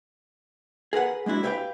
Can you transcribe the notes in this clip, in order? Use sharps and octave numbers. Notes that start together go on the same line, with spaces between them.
G#4 A#4 B4 F#5
G#3 A#3 D4 E4 F#4
G4 B4 C5 E5 F5 G5